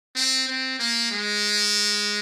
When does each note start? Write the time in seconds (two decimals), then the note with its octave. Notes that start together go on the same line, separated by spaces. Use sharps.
0.15 C4
0.47 C4
0.79 A#3
1.11 G#3